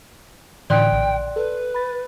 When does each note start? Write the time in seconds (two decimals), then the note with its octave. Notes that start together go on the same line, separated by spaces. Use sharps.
0.70 A2 D3 E3 D5 G5 C6 F#6
0.92 A#1
1.36 A4 B4
1.74 B5 A6